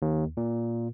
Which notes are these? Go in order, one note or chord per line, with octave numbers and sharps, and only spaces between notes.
D#2
A#2